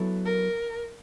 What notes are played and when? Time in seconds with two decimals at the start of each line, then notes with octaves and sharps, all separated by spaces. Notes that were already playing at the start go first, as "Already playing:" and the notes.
Already playing: F#3 B3 E4 A4
0.25 A#4